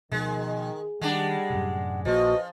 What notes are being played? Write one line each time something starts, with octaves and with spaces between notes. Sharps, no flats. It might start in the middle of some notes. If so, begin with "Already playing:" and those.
B2 D#3 F3 G#3
D#3 G3 G#3 D4 F#5
F#2 A2 C3
A#1 F3 A#3 F#4 B4 D#5